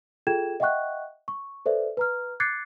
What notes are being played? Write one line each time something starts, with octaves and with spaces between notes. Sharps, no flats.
F4 G#4 A4 G5 G#6 E7
D#5 E5 F#5 G5 C#6 F#6
C#6
A4 B4 C5 D5 E5
B4 A#5 F6
D6 F#6 G#6 A6 C7 C#7